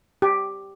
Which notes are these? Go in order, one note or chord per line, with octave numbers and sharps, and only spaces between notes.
G4